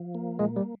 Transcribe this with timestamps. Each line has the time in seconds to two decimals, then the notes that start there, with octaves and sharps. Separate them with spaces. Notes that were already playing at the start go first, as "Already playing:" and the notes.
Already playing: F3
0.15 A#3
0.39 A#2 G#3
0.56 G3